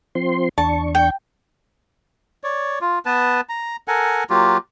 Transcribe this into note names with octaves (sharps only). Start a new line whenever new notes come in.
F3 C4 C6
E2 D4 A5 C#6
G5
C#5 D5
F4
B3 B4 A5
A#5
A4 A#4 F#5 G#5
F#3 A#3 F4 G4